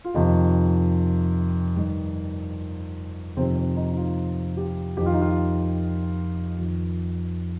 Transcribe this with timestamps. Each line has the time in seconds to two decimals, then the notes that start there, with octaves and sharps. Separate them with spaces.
0.05 F4
0.14 F2 C3 D#3 D#4
1.76 G2 D#3
3.37 F2 C3 D#3 C4
3.57 C4
3.77 D#4
3.92 D#4
3.96 F4
4.57 G4
4.97 F2 D#3 G4
5.06 F4
5.14 D#4
5.21 F4
6.58 F2 D#3